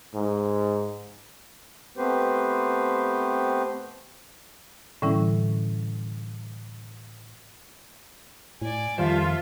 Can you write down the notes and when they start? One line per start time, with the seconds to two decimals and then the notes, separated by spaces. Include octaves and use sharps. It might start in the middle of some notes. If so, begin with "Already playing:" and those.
0.14 G#2
1.97 A3 B3 C4 G4 B4 C5
5.02 A2 D3 E3 G3 C#4 E4
8.62 A2 D5 G#5
8.98 F2 D#3 G3 F4 A4 C5 E5